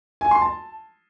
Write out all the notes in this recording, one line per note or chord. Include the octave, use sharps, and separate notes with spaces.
G#5
C6
A5